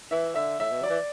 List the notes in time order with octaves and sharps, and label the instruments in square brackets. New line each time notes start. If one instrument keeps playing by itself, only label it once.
[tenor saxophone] E3 [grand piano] E5
[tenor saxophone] D3 [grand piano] E5
[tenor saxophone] A2 [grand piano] E5
[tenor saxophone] B2
[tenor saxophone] F#3 [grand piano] D5
[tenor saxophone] E3